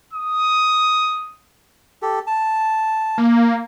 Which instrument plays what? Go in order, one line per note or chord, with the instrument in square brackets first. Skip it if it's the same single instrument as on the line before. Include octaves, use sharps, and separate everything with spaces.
[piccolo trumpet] D#6
[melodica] G4 A4
A5
[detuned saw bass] A#3